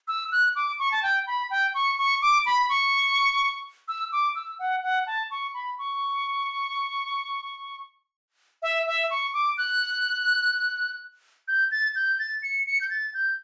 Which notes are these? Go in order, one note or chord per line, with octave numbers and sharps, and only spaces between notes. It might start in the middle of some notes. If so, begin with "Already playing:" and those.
E6
F#6
D6
C#6
A5
G5
B5
G5
C#6
C#6
D6
B5
C#6
E6
D6
E6
F#5
F#5
A5
C#6
B5
C#6
E5
E5
C#6
D6
F#6
G6
A6
G6
A6
C#7
C#7
G6
A6
G6